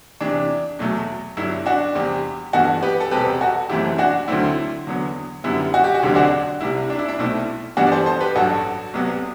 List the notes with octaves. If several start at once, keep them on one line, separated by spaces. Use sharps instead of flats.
E2 C3 E3 D4
E2 B2 F#3 A3
G1 G2 F#3 E4
D4 F#4
E2 C3 G3 C4
G2 E3 B3 F#4 A4
G4 B4
A4
E1 E2 C3 G3 C4 G4 B4
F#4 A4
F#1 F#2 E3 A3 C4 E4 G4
D4 F#4
D2 D3 F#3 A3 C4 E4
E2 D3 F#3 B3
F#2 D3 G3 B3 E4
F#4
G4
F#4
E1 D2 D3 F#3 C4 G4
D4 F#4
C2 C3 G3 E4
D4
E4
D4
B1 B2 A3 C4 E4
G2 E3 G3 B3 D4 F#4
D5
A4 C5
A4 C5
G4 B4
A1 G2 F#3 F#4 A4
C2 C3 F#3 B3